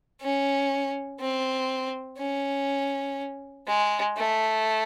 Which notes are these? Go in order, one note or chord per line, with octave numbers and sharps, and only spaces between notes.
C#4
C4
C#4
G#3
A3